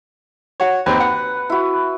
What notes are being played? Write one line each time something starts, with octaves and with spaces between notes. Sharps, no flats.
F#4 C#5
D#2 C4 B4
F#5
E4 F#4